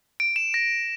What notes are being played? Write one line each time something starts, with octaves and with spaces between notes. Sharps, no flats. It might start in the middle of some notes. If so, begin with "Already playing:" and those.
D7
E7
A#6